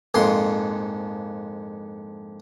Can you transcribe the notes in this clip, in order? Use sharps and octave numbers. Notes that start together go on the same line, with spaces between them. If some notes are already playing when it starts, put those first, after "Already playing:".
A#1 F2 G#2 C6